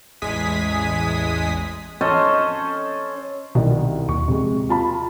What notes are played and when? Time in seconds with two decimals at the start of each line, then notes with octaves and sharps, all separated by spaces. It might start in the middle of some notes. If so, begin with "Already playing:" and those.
0.22 A1 E2 G#3 G#5 D#6 B6
2.01 C#4 A4 C5 D#5
3.55 C2 B2 D#3
4.09 D#2 C#6
4.28 C3 G#3
4.69 F4 A5 B5